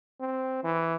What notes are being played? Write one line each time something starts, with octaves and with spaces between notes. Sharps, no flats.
C4
E3